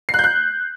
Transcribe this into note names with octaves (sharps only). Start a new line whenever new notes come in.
C7
F#6
G6
F#6